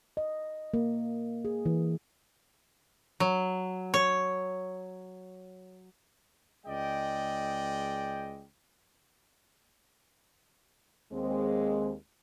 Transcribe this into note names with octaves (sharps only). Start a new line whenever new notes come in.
D#5
A#3
G#4
E3
F#3
C#5
C#2 G#3 D5 D#5 G5
D#2 G#3 C4